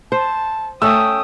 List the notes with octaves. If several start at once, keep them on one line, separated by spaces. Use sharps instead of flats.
C5 A5
A3 C#4 E5 G5 D#6 E6